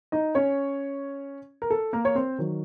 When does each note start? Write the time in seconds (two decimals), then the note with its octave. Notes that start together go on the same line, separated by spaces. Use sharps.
0.12 D#4 D#5
0.35 C#4 C#5
1.62 A#4
1.70 A4
1.93 A#3 A#4
2.05 C#5
2.15 C4 C5
2.38 D#3 F#3